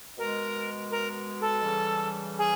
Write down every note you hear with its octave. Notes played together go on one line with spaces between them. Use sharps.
B2 G#3 A#4
A#4
A4
C#3 E3 G3
G#4